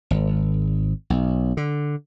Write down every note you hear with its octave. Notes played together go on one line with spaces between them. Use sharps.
G#1
B1
D3